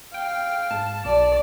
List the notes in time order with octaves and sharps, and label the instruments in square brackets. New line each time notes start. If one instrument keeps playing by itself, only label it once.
[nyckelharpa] F5 [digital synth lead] G5
[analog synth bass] G#2 [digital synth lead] A5
[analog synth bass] B1 [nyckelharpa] D5